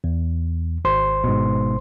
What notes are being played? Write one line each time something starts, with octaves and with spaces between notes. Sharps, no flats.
E2
G#1 C5 C6
G#2 B2